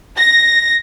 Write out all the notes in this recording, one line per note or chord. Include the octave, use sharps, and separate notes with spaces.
A#6